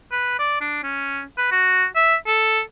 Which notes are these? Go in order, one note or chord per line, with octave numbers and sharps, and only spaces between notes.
B4
D5
D4
C#4
B4
F#4
E5
A4